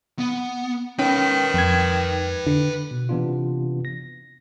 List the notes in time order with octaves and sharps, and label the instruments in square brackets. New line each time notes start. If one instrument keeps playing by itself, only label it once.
[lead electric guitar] B3
[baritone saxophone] D#3 [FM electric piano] C#4 [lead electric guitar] B4 G5
[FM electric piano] F2 G#6
D3
[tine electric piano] B2
C3 E3 B3 D4 F4
A#6